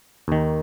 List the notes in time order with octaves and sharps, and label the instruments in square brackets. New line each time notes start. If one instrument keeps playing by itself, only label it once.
[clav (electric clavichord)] D#2 D#3